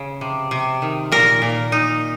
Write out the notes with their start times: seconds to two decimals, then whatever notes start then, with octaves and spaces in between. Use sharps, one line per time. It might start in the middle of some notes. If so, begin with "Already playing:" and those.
Already playing: C#3
0.21 C3
0.51 C3
0.82 D#3
1.12 A#2 A#4
1.42 A#2
1.72 D#4